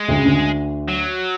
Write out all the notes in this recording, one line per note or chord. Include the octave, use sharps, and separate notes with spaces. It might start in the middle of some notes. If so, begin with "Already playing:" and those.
Already playing: G#3
D2 D3
C#3
D2 D3
F#3